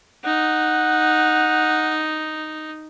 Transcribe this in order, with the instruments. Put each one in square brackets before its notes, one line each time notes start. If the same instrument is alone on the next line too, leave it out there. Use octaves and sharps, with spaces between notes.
[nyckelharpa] D#4 [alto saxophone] F#5